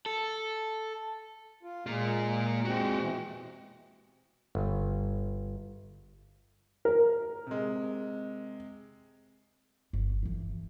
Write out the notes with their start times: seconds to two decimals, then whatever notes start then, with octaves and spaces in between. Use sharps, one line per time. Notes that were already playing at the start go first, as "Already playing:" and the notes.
0.06 A4
1.63 F4
1.87 A#2 G#3 A#3 F4
2.65 G#3 C4 F#4 G4
3.00 B2 E3
4.55 G1
6.85 A#4
7.47 C3 G#3
9.93 G1
10.23 F2 E3